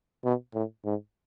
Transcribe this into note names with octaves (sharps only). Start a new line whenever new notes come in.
B2
A2
G#2